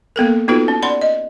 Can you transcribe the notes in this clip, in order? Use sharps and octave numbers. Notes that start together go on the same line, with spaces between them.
A#3 B3 A4 A#4
B3 D#4 F4 F#4 A4 B4
C#4
D5 F#5 B5 C6
D#5